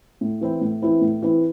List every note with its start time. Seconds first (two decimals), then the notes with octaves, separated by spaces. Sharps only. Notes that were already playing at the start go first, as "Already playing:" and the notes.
0.21 A2
0.41 E3 C4 E4
0.61 A2
0.82 E3 C4 E4
1.01 A2
1.23 E3 C4 E4